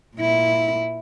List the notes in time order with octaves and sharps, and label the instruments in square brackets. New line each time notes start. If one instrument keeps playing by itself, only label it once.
[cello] A#2 E4